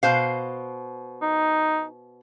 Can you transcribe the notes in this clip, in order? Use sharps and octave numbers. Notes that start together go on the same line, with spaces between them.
B2 C5 F5
D#4